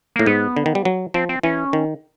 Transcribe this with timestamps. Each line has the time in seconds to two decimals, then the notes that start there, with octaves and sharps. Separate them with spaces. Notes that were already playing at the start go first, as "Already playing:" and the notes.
0.16 A2 A#3
0.26 G#2 B3
0.57 D3
0.66 D#3
0.75 G3
0.85 F#3
1.14 F3 C4
1.29 C4
1.43 E3 C#4
1.73 D#3